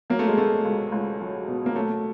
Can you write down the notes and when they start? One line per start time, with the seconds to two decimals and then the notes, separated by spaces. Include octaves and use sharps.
0.10 F#3 A#3
0.19 A3
0.28 G#3
0.37 B2 A3
0.65 C#2
0.92 C#2
1.20 F#3
1.48 B2
1.66 A#3
1.75 F#3 A3